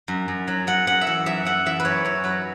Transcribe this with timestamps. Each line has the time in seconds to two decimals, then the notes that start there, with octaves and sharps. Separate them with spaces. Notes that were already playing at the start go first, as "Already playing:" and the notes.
0.08 F#2
0.28 F#2
0.48 F#3
0.67 F#2 F#5
0.87 F#2 F#5
1.01 E5
1.07 E3 F#5
1.26 F#2 E5
1.45 F#2 F#5
1.66 E3 E5
1.80 B4
1.85 F#2 C#5
2.05 F#2 C#5
2.24 F#3 B4